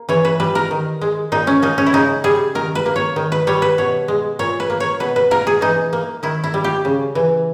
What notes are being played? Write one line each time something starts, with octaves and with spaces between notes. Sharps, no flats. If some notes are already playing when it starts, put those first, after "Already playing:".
Already playing: A#3
E3 C#5
B4
G3 B4
A#4
D#3
G#3
A#2 D#4
C#4
A#3 D#4
C#4
E4
C#3 D#4
G3 G#4
D#3 A#4
B4
A#3
C#5
D#3
B4
G3 C#5
B4
B2 C#5
G#3
A#2 C#5
B4
A#3
C#5
B2 B4
B4
A#3 A#4
G#4
E3 D#4
A#3
D#3 E4
E4
G3
G4
C#3
E3